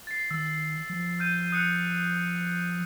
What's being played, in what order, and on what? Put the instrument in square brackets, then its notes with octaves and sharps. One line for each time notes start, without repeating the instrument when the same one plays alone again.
[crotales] A6 C7
[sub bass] D#3 [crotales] E6 A6
[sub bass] F3
[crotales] F6 G6 D#7
D#6 F#6 C#7